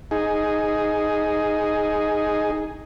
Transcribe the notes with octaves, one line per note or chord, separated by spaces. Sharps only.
D#4 G#4